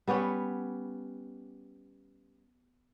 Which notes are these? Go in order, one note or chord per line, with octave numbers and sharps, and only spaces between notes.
G3 B3 C#4 C#5